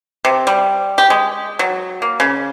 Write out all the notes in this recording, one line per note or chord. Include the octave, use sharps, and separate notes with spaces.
C3
G3
G4
G#3
F#3
A#3
C#3